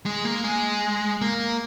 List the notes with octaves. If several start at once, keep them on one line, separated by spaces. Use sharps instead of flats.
G#3
A#3
G#3
A#3